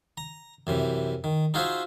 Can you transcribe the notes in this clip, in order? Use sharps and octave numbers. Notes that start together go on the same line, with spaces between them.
A#5
F#2 C3 E3
D#3
D#4 F4 F#4 G#4 C5 E5